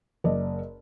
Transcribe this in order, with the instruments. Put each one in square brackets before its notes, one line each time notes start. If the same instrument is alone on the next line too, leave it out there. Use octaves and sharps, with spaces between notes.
[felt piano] F#1 D5 D#5